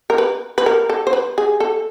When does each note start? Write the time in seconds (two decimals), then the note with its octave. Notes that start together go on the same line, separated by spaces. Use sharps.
0.10 A#4
0.18 B4
0.58 B4
0.66 A#4
0.90 A4
1.07 C5
1.13 B4
1.38 G#4
1.60 A4